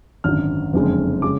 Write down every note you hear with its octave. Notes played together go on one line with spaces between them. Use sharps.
G#1 F#2 D3 F6
F#1 F2 D3 G#3
C#3 G#3 D6